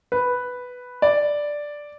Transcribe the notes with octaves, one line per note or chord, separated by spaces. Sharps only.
B4
D5